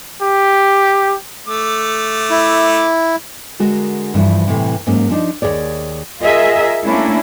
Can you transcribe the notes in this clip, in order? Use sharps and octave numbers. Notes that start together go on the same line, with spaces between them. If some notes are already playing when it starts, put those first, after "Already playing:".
G4
A3 D6
E4
D3 G#3 F#4 A#4
G2 D3 E3 F3
A2 C3 E3
G#2 F#3 A#3 C#4
F3 D4 D#4
D#2 C#3 G#4 C#5 D5
F4 G#4 A#4 D#5 E5
A3 A#3 C#4 D4 E4